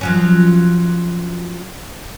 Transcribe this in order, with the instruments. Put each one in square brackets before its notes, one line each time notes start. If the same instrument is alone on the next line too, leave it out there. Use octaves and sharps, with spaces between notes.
[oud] F3 F#3 C#4